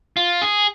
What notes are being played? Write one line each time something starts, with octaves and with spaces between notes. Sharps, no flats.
F4
G#4